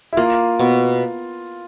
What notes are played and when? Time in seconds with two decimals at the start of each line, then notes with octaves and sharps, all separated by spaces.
0.13 E4
0.17 A#3 F4
0.59 B2